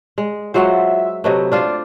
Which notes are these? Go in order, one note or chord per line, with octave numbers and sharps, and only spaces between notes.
G#3
F#3 G#3 F4 F#4 C5 E5 F#5
C3 F#3 A3 B4 D#5
D4 F4 C5 D5